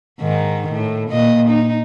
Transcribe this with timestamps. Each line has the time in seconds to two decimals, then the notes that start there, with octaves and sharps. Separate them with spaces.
0.21 G#2 D#3
0.72 A2
1.10 A#2 D#5
1.49 D#4